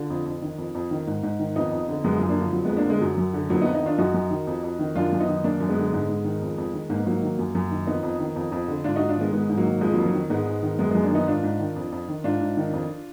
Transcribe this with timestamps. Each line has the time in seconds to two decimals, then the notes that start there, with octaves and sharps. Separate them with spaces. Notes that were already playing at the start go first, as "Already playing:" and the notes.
Already playing: D3 D4 F4
0.10 F2
0.26 F2
0.42 D#3
0.58 F2
0.75 F2
0.91 D#3
1.07 G#2
1.23 G#2
1.39 D#3
1.56 F2 B3 D#4
1.71 F2
1.88 D3
2.04 F#2 G#3 B3
2.16 F#2 F3
2.29 A#3 D4
2.37 D3 F3
2.53 F2 F#3
2.65 F2 G#3 B3
2.77 A#3 D4
2.85 D3 G#3 B3
3.01 F#2 F#3
3.18 F#2
3.34 D3
3.50 F2 F#3 A#3
3.61 B3 D#4
3.66 F2
3.74 B3 D#4
3.82 D#3 D4 F4
3.98 F#2 D#4 F#4
4.14 F#2
4.31 D#3
4.47 F2
4.63 F2
4.79 D#3
4.95 F#2 D4 F4
5.12 F#2
5.20 B3 D#4
5.27 D#3
5.44 F#2 A#3 D4
5.60 F#2
5.68 G#3 B3
5.77 D3
5.93 G#2
6.09 G#2
6.25 D#3
6.42 F2
6.58 F2
6.74 D#3
6.90 G#2 A#3
6.98 B3
7.06 G#2 F#3 A#3
7.22 D#3
7.39 F#2
7.55 F#2
7.71 D#3
7.87 F2 B3 D#4
8.03 F2
8.19 D#3
8.36 F2
8.52 F2
8.68 D3
8.84 G#2 D4 F4
8.96 G#2 D#4 F#4
9.09 D4 F4
9.17 D#3 G#3 B3
9.32 G#2 G#3 B3
9.49 G#2
9.57 F#3 A#3
9.65 D#3
9.81 F2 F3 G#3
9.94 F2 F#3 A#3
10.06 F#3
10.14 D#3
10.30 G#2 G#3 B3
10.46 G#2
10.63 D#3
10.79 F#2 G#3 B3
10.91 F#2 G#3 B3
11.03 A#3 D4
11.11 D#3 B3 D#4
11.27 G#2 D4 F4
11.43 G#2
11.59 D#3
11.76 F2
11.92 F2
12.08 D#3
12.24 G#2 D4 F4
12.41 G#2
12.57 D#3
12.73 F2